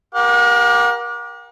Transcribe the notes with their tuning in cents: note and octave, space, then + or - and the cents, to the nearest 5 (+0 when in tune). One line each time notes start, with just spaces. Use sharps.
G4 +0 A#4 +25 F#5 -45